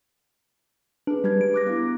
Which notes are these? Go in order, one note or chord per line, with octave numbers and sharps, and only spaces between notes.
D4 G#4 B4
G3 G4 B4 G#6
D7
D6 F#6 A#6
B3 D4 E4